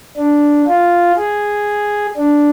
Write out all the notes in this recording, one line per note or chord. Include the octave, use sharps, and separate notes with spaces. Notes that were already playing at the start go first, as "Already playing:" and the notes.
D4
F4
G#4
D4